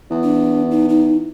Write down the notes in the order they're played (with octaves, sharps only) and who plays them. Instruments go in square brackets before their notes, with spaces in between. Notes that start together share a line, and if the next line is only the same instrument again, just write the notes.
[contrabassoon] E2
[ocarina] D4
D#4
D#4